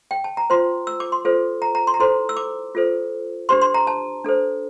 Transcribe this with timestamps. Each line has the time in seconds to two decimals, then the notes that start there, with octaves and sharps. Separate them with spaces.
0.11 G5
0.24 A5
0.37 A#5
0.50 F4 C5 C6
0.87 E6
1.00 D6
1.12 C6
1.25 F4 A4 C5
1.62 A#5
1.75 A#5
1.87 C6
1.94 A#5
2.00 E4 A4 C5 C6
2.29 E6
2.37 D6
2.75 F4 A4 C5
3.49 D4 G4 C5 C6
3.62 C6
3.74 A#5
3.87 A5
4.25 D4 A4 C5